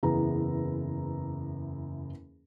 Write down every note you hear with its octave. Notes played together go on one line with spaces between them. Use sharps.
F#1 E2 B3 E4 G#4 A#5